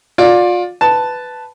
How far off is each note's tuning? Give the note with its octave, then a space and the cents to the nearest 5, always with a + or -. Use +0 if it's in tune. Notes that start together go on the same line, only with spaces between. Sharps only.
F4 +30 D5 +0
B4 +10 A5 +0